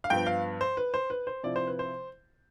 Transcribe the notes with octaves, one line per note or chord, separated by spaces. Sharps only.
F5
G2 F3 B3 G5
F5
C5
B4
C5
B4
C5
C3 F3 C4 E4 D5
C5
B4
C5